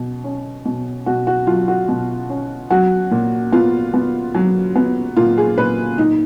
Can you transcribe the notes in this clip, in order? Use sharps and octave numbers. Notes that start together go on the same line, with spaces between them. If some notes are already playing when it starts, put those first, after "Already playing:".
Already playing: B2
C#4
B2
B2 F#4
F#4
F#3 F4
F#4
B2
C#4
F#3 F#4
A#2
B3 F4
B3
F#3
B3
A#2 F4
G#4
A#2 B4
A#2 D#4